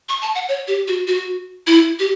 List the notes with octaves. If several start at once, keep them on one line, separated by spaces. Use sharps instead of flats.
C#6
A5
F#5
C#5
G4
F#4
F#4
E4
G4